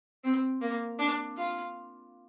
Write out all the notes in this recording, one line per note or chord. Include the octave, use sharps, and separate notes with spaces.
C4
A#3
D4
F4